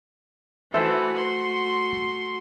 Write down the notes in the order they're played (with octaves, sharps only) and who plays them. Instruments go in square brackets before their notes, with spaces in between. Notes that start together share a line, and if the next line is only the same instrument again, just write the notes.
[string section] E3 [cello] A3 F#4 [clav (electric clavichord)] A4 C5 [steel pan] E5
[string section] C6